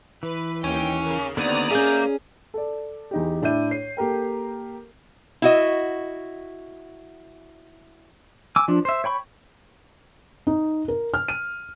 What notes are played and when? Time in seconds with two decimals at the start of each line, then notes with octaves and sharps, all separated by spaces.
0.23 E3 B4
0.64 D#2 C#4 G5
1.02 C#3 A#3
1.37 D#2 D3 B3 C4 D5 A#5 D#6
1.71 A#3 C#4 G#4 E5 D6 G6
2.54 A4 D5
3.11 E2 D#4 G4
3.42 A2 D4 E4 E5 G6 D#7
3.71 C#5 C7
3.97 A#3 G4 A4 A#4 G5
5.42 E4 F#4 D#5
8.56 G#5 D6 E6
8.68 F3 D4
8.85 C5 E5
9.04 C#5 G5 B5 C#6
10.47 D#4
10.88 A#4
11.14 F6
11.28 D#7